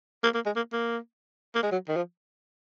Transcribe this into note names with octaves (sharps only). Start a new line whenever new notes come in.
A#3
A#3
G#3
A#3
A#3
A#3
G#3
F#3
D#3
F3